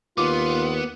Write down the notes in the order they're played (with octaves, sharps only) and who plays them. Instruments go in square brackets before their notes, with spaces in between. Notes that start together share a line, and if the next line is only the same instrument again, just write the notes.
[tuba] D#2 [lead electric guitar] B3 [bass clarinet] F4 [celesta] D6